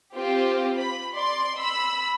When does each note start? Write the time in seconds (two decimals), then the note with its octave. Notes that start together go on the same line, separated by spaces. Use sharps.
0.14 C4 F4 G4 C5
0.77 B5
1.15 D5 C6
1.57 B5 E6